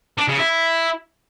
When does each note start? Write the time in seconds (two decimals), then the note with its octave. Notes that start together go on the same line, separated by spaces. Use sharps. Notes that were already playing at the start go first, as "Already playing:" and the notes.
0.18 D4
0.28 C#3
0.38 E4